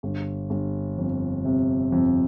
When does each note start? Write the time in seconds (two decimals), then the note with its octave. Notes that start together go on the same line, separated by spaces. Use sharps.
0.03 G1
0.50 G1
0.98 F2
1.45 C3
1.92 F2